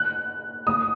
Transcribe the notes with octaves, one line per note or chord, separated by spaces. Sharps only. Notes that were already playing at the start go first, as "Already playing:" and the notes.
Already playing: F#6
D#6